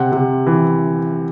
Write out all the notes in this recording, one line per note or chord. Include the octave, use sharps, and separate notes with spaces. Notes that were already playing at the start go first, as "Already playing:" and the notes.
Already playing: C3 F#5
C3
E3